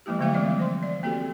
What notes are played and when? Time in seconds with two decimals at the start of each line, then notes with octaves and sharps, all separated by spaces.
0.06 F3 G#3 A#3 E4 G4
0.19 D3 F#3 A3 A#3 E5 F5
0.34 E3 F3 G3 C4 D5 D#5
0.59 C5 C6
0.83 D5
1.03 A#3 C4 F#4 G4 A4